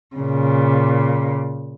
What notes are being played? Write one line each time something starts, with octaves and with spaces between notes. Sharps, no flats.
A#2 C#3